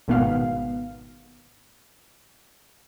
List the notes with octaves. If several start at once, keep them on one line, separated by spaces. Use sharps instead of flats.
G#1 B2 B3 F5